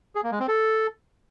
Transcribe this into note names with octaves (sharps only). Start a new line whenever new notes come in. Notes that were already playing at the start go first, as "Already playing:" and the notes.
G#4
A#3
G#3
C4
A4